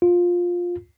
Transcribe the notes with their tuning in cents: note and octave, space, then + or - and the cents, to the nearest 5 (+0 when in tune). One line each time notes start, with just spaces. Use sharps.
F4 +10